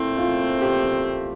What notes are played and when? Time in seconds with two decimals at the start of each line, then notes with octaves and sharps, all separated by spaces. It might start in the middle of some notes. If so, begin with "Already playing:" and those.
Already playing: A#2 A3 C4 E4
0.18 F4
0.62 G4